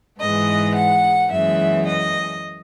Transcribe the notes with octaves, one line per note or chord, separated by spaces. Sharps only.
G#2 E3 G#3 B3 D#5
F#5
F#2 E3 G#3 B3 E5
D#5